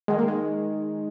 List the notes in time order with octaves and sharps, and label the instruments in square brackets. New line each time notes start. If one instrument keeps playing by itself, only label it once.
[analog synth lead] D#3 [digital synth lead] G#3
[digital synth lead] A#3
G#3